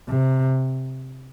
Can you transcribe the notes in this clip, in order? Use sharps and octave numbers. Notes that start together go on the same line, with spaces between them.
C3